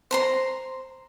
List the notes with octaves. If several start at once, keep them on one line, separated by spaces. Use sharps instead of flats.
C5 A#5 C6